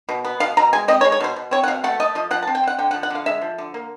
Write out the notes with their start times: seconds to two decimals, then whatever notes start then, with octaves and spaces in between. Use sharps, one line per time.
0.09 B2
0.25 B3
0.40 B2 F5
0.57 B2 A#5
0.73 G#3 G#5
0.88 C4 D#5
1.01 C#5
1.05 G#3
1.12 C#5
1.20 B2 C5
1.36 B2
1.51 C4 C#5
1.64 F#5
1.68 B2 F5
1.84 A3 F#5
2.00 A3 D#5
2.15 F3 D#5
2.31 F3 F#5
2.42 A5
2.47 C4
2.55 G5
2.63 C4 F#5
2.78 D3 G5
2.91 F#5
2.94 F3
3.03 F#5
3.10 D3 F5
3.26 G#3 E5
3.42 F3
3.58 D3
3.74 A#3